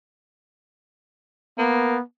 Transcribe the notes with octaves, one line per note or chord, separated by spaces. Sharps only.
A#3 B3